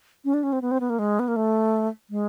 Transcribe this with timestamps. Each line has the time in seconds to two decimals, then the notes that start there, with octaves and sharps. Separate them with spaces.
0.25 C#4
0.34 D4
0.43 C#4
0.53 C4
0.62 B3
0.71 C4
0.80 B3
0.90 A#3
0.99 G#3
1.19 B3
1.28 A#3
1.36 A3
2.10 G#3